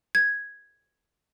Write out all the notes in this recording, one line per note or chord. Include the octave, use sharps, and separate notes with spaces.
G#6